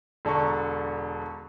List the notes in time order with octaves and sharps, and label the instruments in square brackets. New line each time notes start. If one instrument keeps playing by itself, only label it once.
[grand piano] E1 D3 A5 A#5 C#6